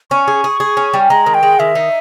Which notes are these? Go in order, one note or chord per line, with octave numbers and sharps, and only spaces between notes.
C#4 C#6
G#4
G#4
G#4
C#4
G3
G#3 A#5
D#3
G5
G#3
D#3 E5
D#4